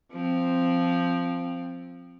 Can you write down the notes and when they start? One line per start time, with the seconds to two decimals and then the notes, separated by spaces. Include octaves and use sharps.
0.12 F3 C4